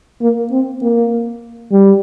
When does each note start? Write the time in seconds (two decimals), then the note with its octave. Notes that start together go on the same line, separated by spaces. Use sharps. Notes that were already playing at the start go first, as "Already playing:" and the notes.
0.22 A#3
0.52 C4
0.82 A#3
1.72 G3